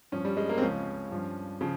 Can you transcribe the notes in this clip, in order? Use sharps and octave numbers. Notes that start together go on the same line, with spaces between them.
G2 F3 C#4
G3
G#3
A#3
C4
C#2 C#3 F3 C#4
G2 F3
C#3 F3